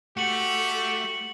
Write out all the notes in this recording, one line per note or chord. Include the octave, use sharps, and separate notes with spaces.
A3 F#4 G4 C#7 F#7